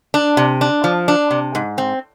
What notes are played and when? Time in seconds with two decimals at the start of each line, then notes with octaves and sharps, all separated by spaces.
0.14 D4
0.37 C3
0.61 D4
0.84 F3
1.08 D4
1.31 C3
1.55 G#2
1.78 C4